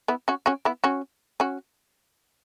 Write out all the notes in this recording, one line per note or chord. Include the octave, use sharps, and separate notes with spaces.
B3 E4
C#4 F#4
C#4 F#4
B3 E4
C#4 F#4
C#4 F#4